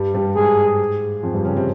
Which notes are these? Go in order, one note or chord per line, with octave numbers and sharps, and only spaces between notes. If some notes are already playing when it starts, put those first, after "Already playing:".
Already playing: G2 G3
G2 G3
G#2 G#3 G#4
F2 F3
G2 G3
C#3 C#4
C3 C4